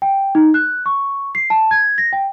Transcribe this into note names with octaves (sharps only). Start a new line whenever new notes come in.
G5
D#4
F#6
C#6
C7
A5
G#6
A#6
G5